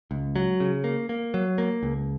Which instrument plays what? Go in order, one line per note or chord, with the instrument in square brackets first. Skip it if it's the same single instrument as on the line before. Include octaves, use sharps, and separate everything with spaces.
[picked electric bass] C#2
F#3
C#3
A#3
A#3
F#3
A#3
C#2